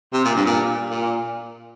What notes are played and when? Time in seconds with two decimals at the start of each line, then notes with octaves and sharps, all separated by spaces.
0.13 C3
0.25 A#2
0.35 G2
0.46 A#2
0.90 A#2